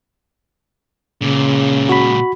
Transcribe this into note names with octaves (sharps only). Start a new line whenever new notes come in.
C#2 A#2 C#3
F#4 B5